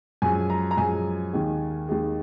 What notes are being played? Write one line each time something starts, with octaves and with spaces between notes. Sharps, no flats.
F#2 F3 G#3 G#5
A#5
A#5
F#2 F3 G#3 G#5
D#2 D#3 G#3
D#2 D#3 G#3